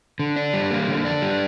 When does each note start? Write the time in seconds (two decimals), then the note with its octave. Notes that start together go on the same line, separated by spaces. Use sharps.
0.19 D3
0.36 D4
0.53 G3
0.71 A#3
0.88 D3
1.05 D4
1.22 G3